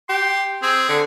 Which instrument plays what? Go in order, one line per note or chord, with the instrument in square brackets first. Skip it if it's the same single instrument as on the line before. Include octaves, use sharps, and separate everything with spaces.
[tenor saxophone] G4 [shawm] C6
[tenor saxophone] C4 [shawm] G#4
[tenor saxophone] D3